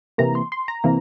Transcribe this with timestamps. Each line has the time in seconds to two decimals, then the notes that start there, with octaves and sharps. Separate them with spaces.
0.18 C3 E3 A#3 A#5
0.35 C6
0.52 C6
0.68 A#5
0.84 C3 E3 A#3